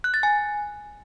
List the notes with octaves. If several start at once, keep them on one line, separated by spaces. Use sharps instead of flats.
F#6
A6
G#5